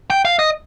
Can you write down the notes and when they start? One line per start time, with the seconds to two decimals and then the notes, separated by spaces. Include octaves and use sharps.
0.10 G5
0.25 F5
0.39 D#5